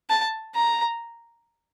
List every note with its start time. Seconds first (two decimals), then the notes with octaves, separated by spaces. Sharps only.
0.10 A5
0.56 A#5